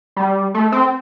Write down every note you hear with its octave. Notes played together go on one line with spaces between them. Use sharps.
G3
A3
C4